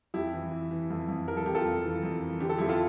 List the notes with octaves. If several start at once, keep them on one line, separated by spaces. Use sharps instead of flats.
F2 E4 G4
E3
E3
E3
F2
F2
E3 A#4
A4
F2 G4
F4 A4
F2
E3
F2
E3
D3 G4
A4
F2 E4 G4
F4 A4